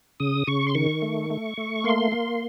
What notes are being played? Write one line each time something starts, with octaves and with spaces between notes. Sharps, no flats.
C#3 D#6
C#3 C#6
C6
D#3 C#6
A3
A3
A3
A#3 C6
A#3